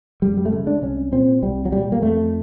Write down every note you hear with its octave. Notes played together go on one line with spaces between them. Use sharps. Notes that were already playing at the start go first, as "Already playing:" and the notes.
F#2 G3
G3
A3
C#3 G#3
D4
C2 C#4
A#2 C4
C2 G3
F#3
A#2 G3
A#3
F2 A3